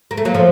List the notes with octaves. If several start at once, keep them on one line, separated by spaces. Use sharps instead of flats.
A#3
A3
F#3 A#3
F3 A3